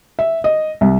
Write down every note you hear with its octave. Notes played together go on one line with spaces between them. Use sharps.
E5
D#5
C2